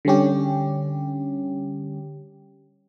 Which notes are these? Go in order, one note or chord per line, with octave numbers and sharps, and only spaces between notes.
D3 G3 C#4 G4